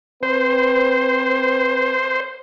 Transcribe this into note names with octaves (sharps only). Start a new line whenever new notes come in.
C4 B4 C5